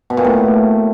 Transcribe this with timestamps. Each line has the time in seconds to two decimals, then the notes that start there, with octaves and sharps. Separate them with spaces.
0.10 B2
0.17 A#2
0.24 A2